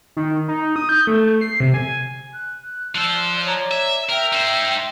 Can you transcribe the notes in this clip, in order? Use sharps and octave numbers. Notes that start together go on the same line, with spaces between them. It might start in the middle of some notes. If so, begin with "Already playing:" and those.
D#3
D#4
D#6
G6
A3
C7
C3
G#5
F#6
F3 C5 D5 E6 F#6
C#5 D5 A#5
E5
A#4 E5 G5
D#4 C5